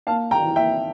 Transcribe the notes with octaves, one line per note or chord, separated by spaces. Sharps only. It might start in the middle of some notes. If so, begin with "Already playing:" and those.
A#3 F5 A5
G5 A#5
E3
E5 G5